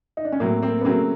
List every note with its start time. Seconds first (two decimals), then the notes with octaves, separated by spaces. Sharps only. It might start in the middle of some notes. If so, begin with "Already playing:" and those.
0.17 D#4
0.25 D4
0.32 C#4
0.40 A2 F#3 A3 A#3 C4
0.62 A#3 C4
0.81 B3
0.85 C#3 F#3 A3 A#3 C4